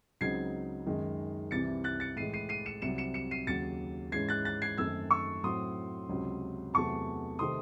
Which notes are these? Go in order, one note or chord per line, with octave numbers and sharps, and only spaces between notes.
C#2 C#3 F#3 C4 D#4 G#6 C7
F#2 D#3 G#3
C2 C3 E3 C4 A6 C#7
F#6 A6
A6 C#7
A2 E3 G#3 C7 D#7
C7 D#7
C7 D#7
C#7 E7
C2 C3 F#3 C#7 E7
C#7 E7
C#7 E7
C7 D#7
D#2 C#3 F#3 A6 C#7
G#2 E3 G#3 C#4 G#6 C7
F#6 A6
F#6 A6
G#6 C7
F#2 D#3 A3 C4 E6 G#6
C#6 E6
A2 F#3 C4 C6 D#6
C#2 C3 F#3 C#4
E2 C3 F#3 A3 A5 C#6
C3 D#3 A3 C4 C6 D#6